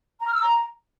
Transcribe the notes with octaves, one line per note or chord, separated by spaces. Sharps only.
A#5
F6
E6
A#5